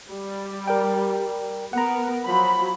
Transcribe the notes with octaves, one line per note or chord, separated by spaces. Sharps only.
G3
A#4 D5 G5
B3 A#4 F#5 A#5
F3 F#3 B5